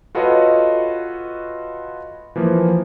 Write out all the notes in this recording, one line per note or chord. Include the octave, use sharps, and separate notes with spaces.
F4 F#4 A4 B4 C#5 D#5
E3 F3 A#3